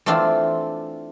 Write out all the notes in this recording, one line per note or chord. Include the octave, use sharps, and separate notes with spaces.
E3 A3 C4 D4 F4